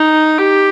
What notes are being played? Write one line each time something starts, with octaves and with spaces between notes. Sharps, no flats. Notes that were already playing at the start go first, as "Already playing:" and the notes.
Already playing: D#4
G4